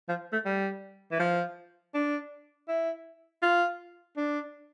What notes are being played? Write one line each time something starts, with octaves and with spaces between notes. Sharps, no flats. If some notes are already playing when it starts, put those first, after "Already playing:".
F3
A3
G3
E3
F3
D4
E4
F4
D4